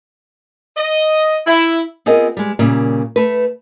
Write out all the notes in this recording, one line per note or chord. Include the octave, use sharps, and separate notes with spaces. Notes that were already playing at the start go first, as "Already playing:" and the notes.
D#5
E4
B3 C4 F4 G#4 A#4 D#5
G3 G#3
A#2 C#3 G3 A#3
A3 B4